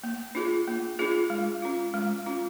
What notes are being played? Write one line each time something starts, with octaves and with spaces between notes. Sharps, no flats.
A#3
D4 F4 G#4
A#3
D4 F4 G#4
G#3
C#4 F4
G#3
C#4 F4